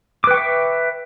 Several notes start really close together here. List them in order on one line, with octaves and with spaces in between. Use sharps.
D6 B4 G5 C#6 E5